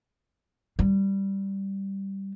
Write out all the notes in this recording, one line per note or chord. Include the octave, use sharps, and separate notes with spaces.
G3